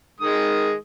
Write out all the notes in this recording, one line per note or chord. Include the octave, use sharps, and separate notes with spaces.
D#3 G#3 D#6